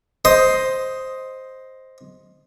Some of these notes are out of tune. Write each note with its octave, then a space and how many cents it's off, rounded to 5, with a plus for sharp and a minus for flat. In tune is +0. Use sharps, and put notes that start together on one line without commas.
C5 +0 D#5 +10